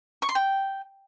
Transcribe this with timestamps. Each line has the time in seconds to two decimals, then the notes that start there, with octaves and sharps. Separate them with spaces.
0.22 C#6
0.29 C6
0.35 G5